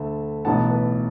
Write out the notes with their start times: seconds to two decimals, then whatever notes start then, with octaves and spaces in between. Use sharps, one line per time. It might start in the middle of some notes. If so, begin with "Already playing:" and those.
Already playing: D2 D3 A3 E5
0.45 B1 A2 E3 B3 F#5 A5
0.71 B4